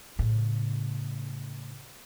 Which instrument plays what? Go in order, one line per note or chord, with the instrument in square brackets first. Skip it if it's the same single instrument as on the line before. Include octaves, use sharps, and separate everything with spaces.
[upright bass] A2 C#3